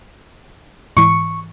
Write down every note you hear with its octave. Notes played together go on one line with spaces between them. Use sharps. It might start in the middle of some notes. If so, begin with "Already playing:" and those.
G#2 E3 C#6